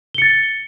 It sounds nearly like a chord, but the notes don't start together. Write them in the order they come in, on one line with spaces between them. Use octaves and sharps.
G7 C#7 A6